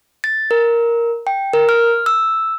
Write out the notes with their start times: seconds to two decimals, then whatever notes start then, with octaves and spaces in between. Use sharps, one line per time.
0.24 A6
0.51 A#4
1.27 G5
1.53 A#4
1.69 F6
2.06 E6